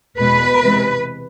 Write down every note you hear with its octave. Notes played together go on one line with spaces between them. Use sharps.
E2 B2 G#3 B4
C3 E3 G#3